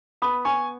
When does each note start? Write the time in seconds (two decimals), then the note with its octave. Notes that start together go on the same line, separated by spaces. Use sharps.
0.22 B3 B5 D#6
0.45 B3 G#5 C#6